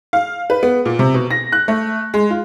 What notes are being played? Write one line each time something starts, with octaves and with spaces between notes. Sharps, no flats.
F5
B4
B3
A#2
C3
B2
A#6
F#6
A3
G#3
F4